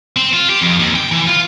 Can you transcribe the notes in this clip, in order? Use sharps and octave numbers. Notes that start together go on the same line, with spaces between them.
C4
F4
G4
F2
D#2
G5
E3
F4